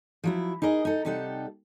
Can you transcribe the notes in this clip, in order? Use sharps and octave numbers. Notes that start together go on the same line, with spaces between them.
F3 F#3 E4
D#4 G#4 A#4 D#5
D#4 A4
C3 G3 D#4 A4 F#5